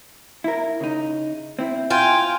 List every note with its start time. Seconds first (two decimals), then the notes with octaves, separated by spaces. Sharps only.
0.44 E4 A#4
0.81 C#3 D#4
1.59 C4 E4
1.90 F4 G5 G#5